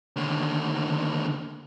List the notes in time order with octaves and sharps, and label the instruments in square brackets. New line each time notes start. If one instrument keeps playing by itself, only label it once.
[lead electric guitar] D#2 D3